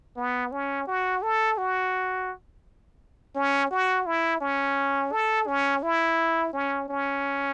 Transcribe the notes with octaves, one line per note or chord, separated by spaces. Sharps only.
B3
C#4
F#4
A4
F#4
C#4
F#4
E4
C#4
A4
C#4
E4
C#4
C#4